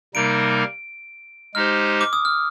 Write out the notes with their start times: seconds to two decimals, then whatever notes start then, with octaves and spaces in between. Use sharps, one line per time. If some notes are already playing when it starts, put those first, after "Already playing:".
0.14 C3 G3 A#3 D#4 A#4 D7
1.54 G#3 D#4 G4 C5 F6
2.01 D6
2.13 D#6
2.25 F6